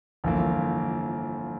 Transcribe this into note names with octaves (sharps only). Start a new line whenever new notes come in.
G1 F2 E3 A#3